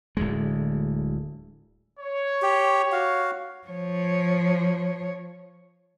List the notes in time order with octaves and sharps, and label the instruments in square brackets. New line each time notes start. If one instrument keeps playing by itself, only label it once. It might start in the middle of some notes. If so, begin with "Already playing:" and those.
[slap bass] D1 D2 G#3
[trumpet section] C#5
[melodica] G4
F#4 F5
[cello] F3 C#5